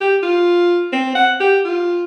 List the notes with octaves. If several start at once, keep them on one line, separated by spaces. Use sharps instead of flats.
G4
F4
C4
F#5
G4
F4